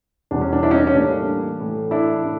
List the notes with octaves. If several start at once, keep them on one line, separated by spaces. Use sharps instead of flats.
E2 B2 G3 D4
C#4
D4
D4 E4
C#4 D#4
D4
C#4
A2 E3 G3 A#3 D4
A2 E3 A3
D4 E4
A2 E3 A3